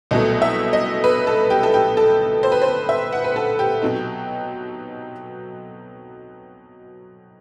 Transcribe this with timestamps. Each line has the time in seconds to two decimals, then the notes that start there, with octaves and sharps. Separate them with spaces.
0.11 C2 B2 F#3 A3 D#5
0.42 E5
0.73 D#5
1.04 B4
1.27 A4
1.50 G4
1.63 A4
1.74 G4
1.97 A4
2.43 C5
2.52 B4
2.62 C5
2.89 E5
3.13 F#5
3.24 B4
3.36 A4
3.59 G4
3.82 B2 F#3 C4 D#4